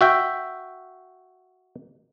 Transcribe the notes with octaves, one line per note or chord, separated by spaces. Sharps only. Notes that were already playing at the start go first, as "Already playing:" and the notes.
F#4 E5 G5